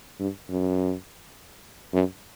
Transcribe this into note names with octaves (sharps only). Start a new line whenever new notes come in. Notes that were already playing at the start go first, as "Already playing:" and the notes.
G2
F#2
F#2